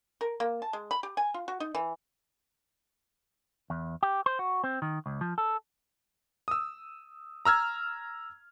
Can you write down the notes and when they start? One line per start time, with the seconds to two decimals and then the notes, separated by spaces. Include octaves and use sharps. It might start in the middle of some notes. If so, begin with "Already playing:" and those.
0.21 A#4
0.40 A#3
0.62 A5
0.73 G#3
0.91 B5
1.03 G4
1.17 G#5
1.34 F4
1.48 F#4
1.60 D#4
1.75 E3
3.70 E2
4.03 G4
4.26 C5
4.39 F#4
4.64 C4
4.82 D#3
5.06 C#2
5.21 F3
5.38 A4
6.48 D#6 E6
7.45 A#5 E6 F6 G#6